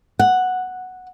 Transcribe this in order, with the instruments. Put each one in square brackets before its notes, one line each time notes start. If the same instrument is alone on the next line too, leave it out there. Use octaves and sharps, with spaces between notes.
[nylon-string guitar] F#5